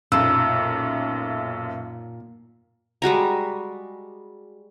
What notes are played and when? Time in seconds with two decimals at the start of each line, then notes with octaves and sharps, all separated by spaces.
0.12 B1 F#2 A#2 E6
3.02 G3 G#3 F#4 A#5